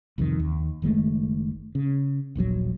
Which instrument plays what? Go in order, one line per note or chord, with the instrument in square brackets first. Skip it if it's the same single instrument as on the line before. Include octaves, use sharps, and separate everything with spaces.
[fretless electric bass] C2 F2 D3 D#3
D#2
F#1 D#3 G#3 A3
C#3
D#1 A#1 C3 F#3